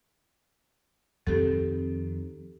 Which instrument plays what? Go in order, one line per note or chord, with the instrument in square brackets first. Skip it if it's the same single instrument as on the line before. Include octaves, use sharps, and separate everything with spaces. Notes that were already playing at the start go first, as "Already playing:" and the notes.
[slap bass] F2 D#3 C4 [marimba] G4 A4